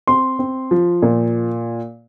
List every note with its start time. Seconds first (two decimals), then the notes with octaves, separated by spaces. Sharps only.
0.07 C4 C6
0.39 C4
0.71 F3
1.02 A#2